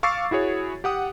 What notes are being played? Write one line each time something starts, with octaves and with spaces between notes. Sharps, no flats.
F5 C#6 D6 E6 A6 C7
E4 F#4 G#4 C#5
G4 F#5 D#6